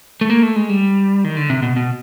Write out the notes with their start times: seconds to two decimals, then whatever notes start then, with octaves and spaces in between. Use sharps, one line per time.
0.21 A3
0.30 A#3
0.43 A3
0.56 G#3
0.69 G3
1.24 D#3
1.37 D3
1.50 C3
1.63 B2
1.76 B2